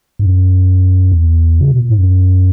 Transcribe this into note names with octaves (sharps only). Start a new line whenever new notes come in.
G#2
F#2
E2
C#3
B2
A#2
G#2
F#2